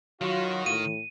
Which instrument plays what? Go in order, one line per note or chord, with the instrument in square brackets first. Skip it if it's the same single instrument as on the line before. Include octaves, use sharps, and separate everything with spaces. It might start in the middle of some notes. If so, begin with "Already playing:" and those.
[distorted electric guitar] D#3 [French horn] F#3 [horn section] F4 F#4
[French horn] A2 [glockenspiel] D#7